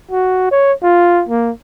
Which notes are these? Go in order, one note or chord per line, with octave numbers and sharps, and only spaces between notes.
F#4
C#5
F4
A#3